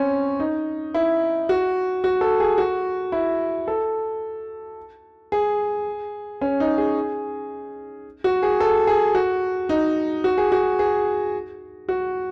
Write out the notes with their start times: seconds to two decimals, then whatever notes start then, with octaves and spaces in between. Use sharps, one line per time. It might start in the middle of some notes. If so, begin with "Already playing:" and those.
Already playing: C4 C#4
0.40 D#4
0.94 E4
1.49 F#4
2.04 F#4
2.21 A4
2.40 G#4
2.58 F#4
3.12 E4
3.68 A4
5.32 G#4
6.41 C#4
6.60 D#4
6.78 G#4
8.24 F#4
8.43 G#4
8.60 A4
8.87 G#4
9.15 F#4
9.69 D#4
10.24 F#4
10.38 G#4
10.52 F#4
10.79 G#4
11.89 F#4